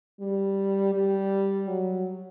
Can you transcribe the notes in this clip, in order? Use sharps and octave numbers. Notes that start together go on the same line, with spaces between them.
G3
G3
F#3